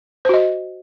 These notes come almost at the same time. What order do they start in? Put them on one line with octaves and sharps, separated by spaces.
C5 F#4 D#5